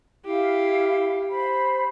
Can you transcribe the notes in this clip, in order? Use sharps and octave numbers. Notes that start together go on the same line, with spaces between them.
E4 G4 F5
C5 B5